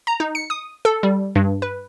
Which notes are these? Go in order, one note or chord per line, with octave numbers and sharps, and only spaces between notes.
A#5
D#4
C#7
D#6
A4
G3
G2
B4